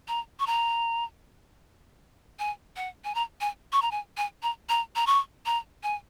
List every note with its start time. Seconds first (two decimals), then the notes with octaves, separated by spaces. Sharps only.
0.08 A#5
0.40 C#6
0.47 A#5
2.39 G#5
2.76 F#5
3.04 G#5
3.15 A#5
3.41 G#5
3.73 C#6
3.82 A#5
3.91 G#5
4.17 G#5
4.43 A#5
4.69 A#5
4.96 A#5
5.07 C#6
5.46 A#5
5.83 G#5